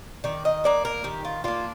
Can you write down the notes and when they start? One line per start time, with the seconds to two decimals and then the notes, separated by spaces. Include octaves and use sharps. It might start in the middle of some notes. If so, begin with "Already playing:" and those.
0.24 D#3 D5
0.45 D#5
0.64 A#3 D4 D5
0.85 A#4
1.04 D#3 G4
1.25 F4
1.44 A#3 D4 F4